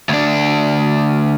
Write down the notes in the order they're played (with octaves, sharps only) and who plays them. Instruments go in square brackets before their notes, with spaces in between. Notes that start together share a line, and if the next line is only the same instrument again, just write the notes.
[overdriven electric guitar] D2 D4